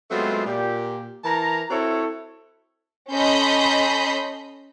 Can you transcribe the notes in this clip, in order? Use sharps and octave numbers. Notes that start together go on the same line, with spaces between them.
F#3 G#3 A3 B3 C4 F4
A#2 G4
E3 A#4 A5 A#5
C4 E4 F#4 A4 C#5
C#4 A4 D#5 B5 C6 G6